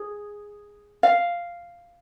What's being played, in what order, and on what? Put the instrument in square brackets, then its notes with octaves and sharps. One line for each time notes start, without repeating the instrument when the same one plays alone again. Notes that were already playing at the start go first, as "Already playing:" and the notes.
Already playing: [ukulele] G#4
F5